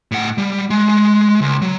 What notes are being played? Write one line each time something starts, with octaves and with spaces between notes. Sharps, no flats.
A2 F#5
G3
G#3
G#3
C#2
F#3